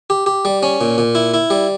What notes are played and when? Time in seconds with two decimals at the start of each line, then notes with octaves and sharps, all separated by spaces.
0.10 G4
0.26 G4
0.45 G3
0.63 C#4
0.81 A#2
0.98 A#2
1.15 E4
1.34 E4
1.50 G3